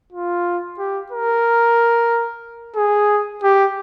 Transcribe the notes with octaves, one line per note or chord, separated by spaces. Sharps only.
F4
G4
A#4
G#4
G4